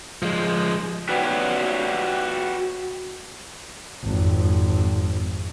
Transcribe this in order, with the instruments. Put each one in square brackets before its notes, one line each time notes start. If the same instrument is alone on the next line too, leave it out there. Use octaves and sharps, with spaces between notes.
[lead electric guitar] F3 G#3
[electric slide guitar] F#4 G4 B4 C#5 D5
[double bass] G#1 F2